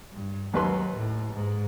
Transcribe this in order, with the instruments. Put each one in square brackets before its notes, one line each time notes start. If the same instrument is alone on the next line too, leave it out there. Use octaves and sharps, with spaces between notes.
[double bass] G2
[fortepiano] D#2 B4 C6 [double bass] F#3
[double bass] A2
G#2